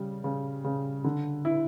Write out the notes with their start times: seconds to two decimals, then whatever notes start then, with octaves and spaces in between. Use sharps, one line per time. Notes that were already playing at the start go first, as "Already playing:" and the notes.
Already playing: C#3 G3
0.24 C#3
0.64 C#3
1.04 D3
1.45 E4